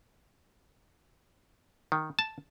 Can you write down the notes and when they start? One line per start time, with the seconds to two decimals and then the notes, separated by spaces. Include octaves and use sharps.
1.92 D#3
2.19 A5